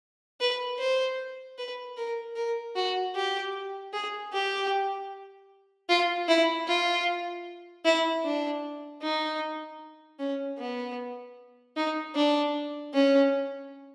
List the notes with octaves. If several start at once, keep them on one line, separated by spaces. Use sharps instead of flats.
B4
C5
B4
A#4
A#4
F#4
G4
G#4
G4
F4
E4
F4
E4
D4
D#4
C#4
B3
D#4
D4
C#4